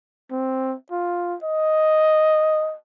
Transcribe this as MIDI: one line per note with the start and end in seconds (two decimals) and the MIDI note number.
0.31 0.75 60
0.91 1.36 65
1.44 2.76 75